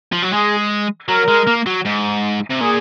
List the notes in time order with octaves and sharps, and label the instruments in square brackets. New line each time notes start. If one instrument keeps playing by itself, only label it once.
[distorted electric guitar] F3
F#3
[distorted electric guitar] G#3 [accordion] G#4
[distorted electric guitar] F#3 [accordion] A#4
[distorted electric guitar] G#3
A#3
F#3
G#2
C3
[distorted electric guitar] A#2 [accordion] G#4